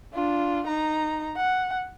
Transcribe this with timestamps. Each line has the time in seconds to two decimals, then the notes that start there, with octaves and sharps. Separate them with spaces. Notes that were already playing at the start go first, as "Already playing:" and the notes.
0.13 D4 F4
0.67 D#4 A#5
1.37 F#5